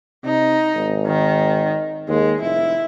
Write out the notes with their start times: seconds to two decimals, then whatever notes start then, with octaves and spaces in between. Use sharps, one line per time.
0.24 C3 D#4
0.75 G#1
1.06 D#3
2.09 D#2 G#3
2.41 F1 E4